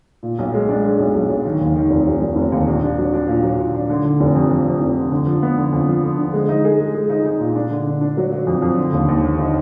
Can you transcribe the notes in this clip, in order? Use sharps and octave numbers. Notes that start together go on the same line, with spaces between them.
A#2
B1
G#3
D4
G#3
B1
B1
B1
D#3
D#2
D#3
F1
F1
F1
F1
D#2
A#1
D4
F#3
D4
A#2
F#3
A#2
D4
D3
D3
F1
F2
F2
F2
F1
D3
D3
F3
B3
D3
F2
F3
D3
D3
G#3
D#4
G#4
G#3
G#4
D#4
D#4
A#2
D4
D3
D4
D4
F#3
F#3
F2
F2
D3
D#2
D#2
D3
D#4